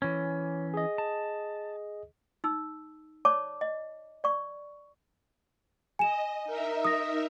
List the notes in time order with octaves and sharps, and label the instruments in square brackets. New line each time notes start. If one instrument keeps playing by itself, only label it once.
[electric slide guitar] E3 C#4 [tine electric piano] C#5
[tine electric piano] G#4 D#5
[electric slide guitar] A5
[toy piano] D#4 E6
C#5 D5 A5 D6
D#5
D5 C#6
[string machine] D#5 [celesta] G#5 E7
[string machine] D#4 A#4 E5
[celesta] D#6 A#6